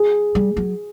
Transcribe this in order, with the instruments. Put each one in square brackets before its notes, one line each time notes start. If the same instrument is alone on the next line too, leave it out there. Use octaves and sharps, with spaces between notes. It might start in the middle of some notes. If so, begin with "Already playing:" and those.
Already playing: [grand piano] G#4
[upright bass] G3
F#3